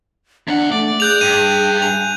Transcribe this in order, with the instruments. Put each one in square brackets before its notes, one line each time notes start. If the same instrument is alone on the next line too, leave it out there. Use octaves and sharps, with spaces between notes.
[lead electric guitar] E2 F#5 [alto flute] D4
[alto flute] A3 [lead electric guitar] D5
[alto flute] G#4 [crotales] F#6 G6 F7
[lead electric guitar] G2 [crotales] D#7
[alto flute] G#5 [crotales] F7